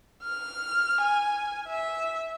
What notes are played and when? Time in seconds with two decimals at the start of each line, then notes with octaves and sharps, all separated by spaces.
0.23 F6
1.00 G#5
1.68 E5